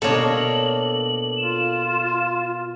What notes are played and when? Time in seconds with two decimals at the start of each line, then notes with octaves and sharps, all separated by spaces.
0.02 B2 A#3 D4 A4 C#5 F#7
1.37 F4 E7